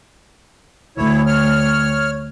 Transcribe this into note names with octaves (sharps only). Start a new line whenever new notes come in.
D2 E4 C#5
C#5 F6